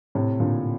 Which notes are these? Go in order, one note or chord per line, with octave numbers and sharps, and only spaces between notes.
A2 C3
A#2 D3